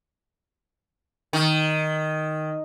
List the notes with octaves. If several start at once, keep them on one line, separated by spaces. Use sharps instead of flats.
D#3